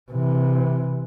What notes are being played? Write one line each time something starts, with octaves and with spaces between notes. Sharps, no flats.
C3 E3